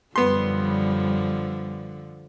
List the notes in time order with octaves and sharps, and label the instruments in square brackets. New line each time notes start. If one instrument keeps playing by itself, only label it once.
[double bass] F#2 G3 [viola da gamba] D3 F3 [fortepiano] B3 C6